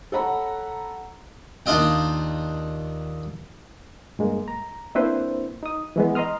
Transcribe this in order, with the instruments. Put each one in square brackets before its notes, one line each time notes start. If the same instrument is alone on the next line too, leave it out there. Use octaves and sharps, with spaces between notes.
[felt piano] A4 C#5 F#5 A#5 B5
[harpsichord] D#2 D4 D#4 F4 D#5 G5
[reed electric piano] G2 G#3 A#3
A#5
A#3 C4 D4 E4 B4 C5
D#4 D#6
E3 G#3 B3
D#5 A#5 C6 D#6 F6